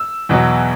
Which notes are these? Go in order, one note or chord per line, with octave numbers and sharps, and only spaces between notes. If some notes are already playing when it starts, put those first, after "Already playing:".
Already playing: E6
E2 B2 F#3